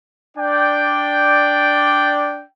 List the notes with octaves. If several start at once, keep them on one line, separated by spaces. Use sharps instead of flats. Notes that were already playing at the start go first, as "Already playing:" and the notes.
D4 D5 G5